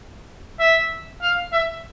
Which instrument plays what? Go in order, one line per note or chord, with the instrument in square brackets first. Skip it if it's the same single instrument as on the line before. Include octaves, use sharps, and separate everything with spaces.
[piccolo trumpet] E5
F5
E5